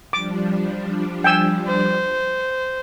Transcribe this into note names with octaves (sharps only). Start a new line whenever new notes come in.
F3 G3 D4 D6
G5 G#5 E6
C5